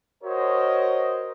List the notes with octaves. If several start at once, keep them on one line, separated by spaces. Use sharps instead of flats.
F#4 A#4 C5 C#5 D#5